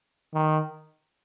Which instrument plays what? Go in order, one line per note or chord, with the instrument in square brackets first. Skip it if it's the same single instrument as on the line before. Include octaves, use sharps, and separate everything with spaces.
[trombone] D#3